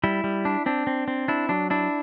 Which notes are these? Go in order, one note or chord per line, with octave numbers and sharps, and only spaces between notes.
G3 E4
G3
D4
C4 D4
C4
C4
D4 E4
F#3 D4
D4 E4